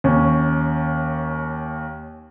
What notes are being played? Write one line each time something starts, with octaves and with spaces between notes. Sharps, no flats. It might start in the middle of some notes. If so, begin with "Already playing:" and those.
D#2 C#4